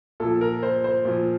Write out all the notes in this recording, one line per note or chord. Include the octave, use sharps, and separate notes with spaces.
A#2 F3 A4
A#4
C5
C5
A#2 F3